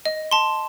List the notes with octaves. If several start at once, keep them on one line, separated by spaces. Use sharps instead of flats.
D#5
A5 C6